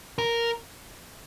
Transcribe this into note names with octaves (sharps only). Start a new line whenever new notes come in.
A#4